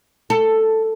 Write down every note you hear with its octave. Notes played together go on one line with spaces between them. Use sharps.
A4